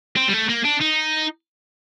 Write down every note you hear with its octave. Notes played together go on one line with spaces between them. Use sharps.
C4
G3
A3
A#3
D4
D#4